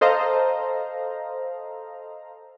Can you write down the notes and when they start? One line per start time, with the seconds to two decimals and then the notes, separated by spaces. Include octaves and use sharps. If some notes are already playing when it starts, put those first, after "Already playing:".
0.01 A4 C5 D#5 F5 A#5